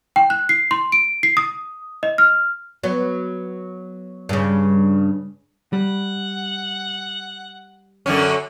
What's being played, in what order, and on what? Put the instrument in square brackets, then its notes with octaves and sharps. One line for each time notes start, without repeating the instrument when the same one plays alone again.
[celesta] G5
F#6
C7
C6
D7
C7
D#6
D#5
F6
[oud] F#3 B3
G2 C#3
[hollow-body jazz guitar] G3 [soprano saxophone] F#5
[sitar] F#2 D3 C#4